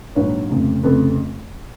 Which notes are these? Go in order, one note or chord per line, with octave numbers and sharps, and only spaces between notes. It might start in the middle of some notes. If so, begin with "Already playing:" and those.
A#1 G#2 D#3 F#3 B4 C#5
F1 F2 C#3
F1 F2 C#3 A4 B4